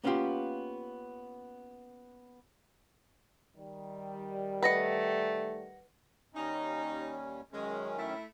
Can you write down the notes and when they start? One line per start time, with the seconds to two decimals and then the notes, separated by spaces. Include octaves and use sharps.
0.04 A#3 B3 C#4 D#4 F4 G4
3.56 D#3 G3
4.63 A3 B4 D#5 F#5 A#6 C#7
6.35 D#2 G3 C#4 D#4
7.52 F#2 D#3 G#3 C#4
7.98 A3 E4